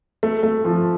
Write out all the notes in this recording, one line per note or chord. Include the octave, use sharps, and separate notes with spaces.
A3
A3
F3